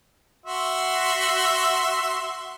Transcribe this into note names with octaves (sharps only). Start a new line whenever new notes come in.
F#4 E5 C6